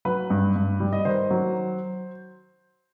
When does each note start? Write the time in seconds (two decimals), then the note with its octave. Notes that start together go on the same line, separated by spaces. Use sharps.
0.05 F#3 B4
0.30 G2
0.56 G2
0.80 G3
0.93 D#5
1.05 D#3 C5
1.30 F#3